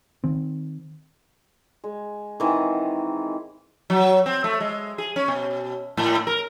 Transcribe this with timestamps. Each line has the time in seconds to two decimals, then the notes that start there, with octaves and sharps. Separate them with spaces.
0.24 D#3 C4
1.84 G#3
2.40 D#3 E3 C4 F#5
3.90 F#3
4.26 C4
4.44 A3
4.60 G#3
4.98 G#4
5.16 C#4
5.28 B2
5.97 A2
6.27 A#4